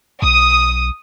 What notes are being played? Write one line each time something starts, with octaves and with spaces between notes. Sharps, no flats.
B1 D#6